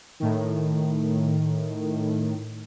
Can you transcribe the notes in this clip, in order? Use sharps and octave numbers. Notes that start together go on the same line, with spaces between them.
A2 D#3